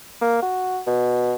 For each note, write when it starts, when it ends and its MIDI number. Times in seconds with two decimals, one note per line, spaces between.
0.21 0.40 58
0.42 0.80 66
0.87 1.36 47